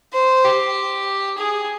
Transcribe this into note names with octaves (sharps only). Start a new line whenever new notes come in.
C5
G4
G#4